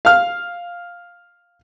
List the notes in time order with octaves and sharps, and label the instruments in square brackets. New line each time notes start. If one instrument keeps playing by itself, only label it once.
[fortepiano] F5 F6